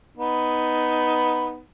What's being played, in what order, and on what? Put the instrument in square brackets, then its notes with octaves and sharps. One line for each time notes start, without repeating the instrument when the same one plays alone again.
[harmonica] B3 D#4